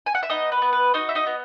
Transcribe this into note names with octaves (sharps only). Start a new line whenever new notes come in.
G#5
F#5
E5
B3 D#4 D#5
B4
B3
B4
D#4 F#4 D#5
E5
D#4 D#5
B3